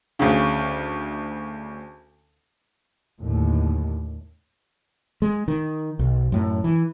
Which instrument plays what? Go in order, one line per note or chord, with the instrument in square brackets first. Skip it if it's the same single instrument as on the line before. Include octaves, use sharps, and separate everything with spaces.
[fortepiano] D2 C#3
[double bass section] D#2 A2 D3
[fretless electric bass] G#3
D#3
B1
F#2 A2
E3